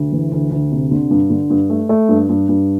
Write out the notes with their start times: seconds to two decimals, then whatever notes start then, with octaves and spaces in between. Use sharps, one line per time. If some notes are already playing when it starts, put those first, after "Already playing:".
Already playing: D2
0.12 E3
0.32 D2
0.51 D2
0.72 C3
0.91 D3
1.10 G2
1.30 D3
1.50 G2
1.70 A3
1.89 A3
2.09 G2
2.29 G2
2.49 G2